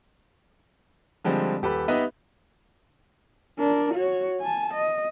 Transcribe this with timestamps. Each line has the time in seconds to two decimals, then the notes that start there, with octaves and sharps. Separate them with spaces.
1.25 D3 F3 G3 G#3 C4
1.62 D#1 G4 A4 B4 B5
1.88 B3 D#4 G4 B4 D#5 E5
3.59 D4 A#4
3.95 F#4 C#5
4.40 G#5 A5
4.74 D#5